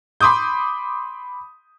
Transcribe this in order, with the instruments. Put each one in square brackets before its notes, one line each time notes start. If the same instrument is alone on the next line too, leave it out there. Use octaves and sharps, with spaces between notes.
[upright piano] B5 C6 D6 D#6 G6